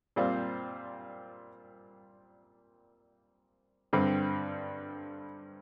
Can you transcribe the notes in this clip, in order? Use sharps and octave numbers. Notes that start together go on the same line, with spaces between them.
A#2 G3 C4 F4 C5
G2 D3 G3 C4